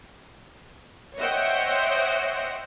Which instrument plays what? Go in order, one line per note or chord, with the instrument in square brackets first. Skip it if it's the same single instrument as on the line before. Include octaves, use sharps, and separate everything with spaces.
[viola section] C5 C#5 D#5 E5 F#5 G5